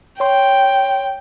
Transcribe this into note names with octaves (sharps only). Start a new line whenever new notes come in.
C#5 G5 C6